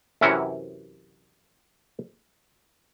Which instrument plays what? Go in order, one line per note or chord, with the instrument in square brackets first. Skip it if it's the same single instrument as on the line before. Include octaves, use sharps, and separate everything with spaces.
[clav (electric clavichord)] F#2 C3 E3 C#4 E4 F#4